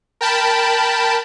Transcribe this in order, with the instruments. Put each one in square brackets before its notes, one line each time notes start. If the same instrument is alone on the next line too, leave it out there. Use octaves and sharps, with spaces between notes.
[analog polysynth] A#4 G5 A5 B5